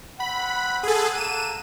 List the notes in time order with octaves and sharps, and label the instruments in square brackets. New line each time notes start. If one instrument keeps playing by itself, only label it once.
[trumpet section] C4 F#5 [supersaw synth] B5
[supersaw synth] G#4 A4
[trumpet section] A#3 A4 F#5 [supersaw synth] D#7 E7